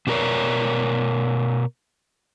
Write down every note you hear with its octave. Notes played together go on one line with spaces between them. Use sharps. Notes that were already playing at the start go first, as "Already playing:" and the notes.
B2 D4 G4 A#4 C#5 D5